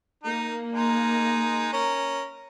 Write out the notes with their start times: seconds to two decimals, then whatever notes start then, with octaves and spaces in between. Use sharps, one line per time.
0.23 A#3 D#4
0.73 G#3 D#4
1.73 C#4 A#4